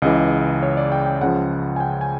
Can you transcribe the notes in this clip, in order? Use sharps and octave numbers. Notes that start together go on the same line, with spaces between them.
C#2 C#3 E3 D#5
C#5
D5
G5
G5
C#2 C#3 F3 F#5
G#5
G5
G#5